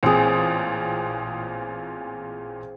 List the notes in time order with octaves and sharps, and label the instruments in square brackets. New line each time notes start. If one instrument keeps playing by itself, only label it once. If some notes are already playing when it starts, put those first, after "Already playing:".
[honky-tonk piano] A1 A#2 [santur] C4 G#4